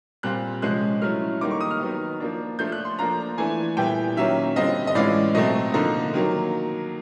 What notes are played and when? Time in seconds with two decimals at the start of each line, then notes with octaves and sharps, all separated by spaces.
0.23 A#2 G3 C4 F4 F#6
0.62 C3 F3 G#3 C#4 F#6
1.02 F#3 A3 C#4 E4 F6
1.41 D#3 G3 A#3 D#4 D6
1.51 C#6
1.61 D#6
1.71 F6
1.80 D#3 F#3 B3 D#4
2.20 F3 A#3 D4
2.59 F3 A3 D4 F4 G6
2.72 F#6
2.85 C6
2.99 F3 A#3 D4 F4 A#5
3.38 E3 A3 D4 G#5
3.77 A#2 G3 B3 E4 G5
4.17 D#3 F#3 A#3 C#4 E5
4.56 D3 G3 C4 F4 D#5
4.87 D#5
4.95 A2 E3 G#3 C#4 F4 D5
5.35 B2 F#3 A3 C4 D#5
5.74 D3 F3 A#3 D#4
6.13 D#3 F#3 A#3